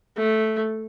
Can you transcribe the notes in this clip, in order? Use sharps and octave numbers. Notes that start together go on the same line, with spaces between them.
A3